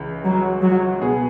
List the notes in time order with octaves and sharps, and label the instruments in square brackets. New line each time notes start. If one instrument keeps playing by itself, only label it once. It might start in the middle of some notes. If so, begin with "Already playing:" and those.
Already playing: [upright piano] C#2 C#3 E3
[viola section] F#3
F#3
[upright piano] B2 B3 G#4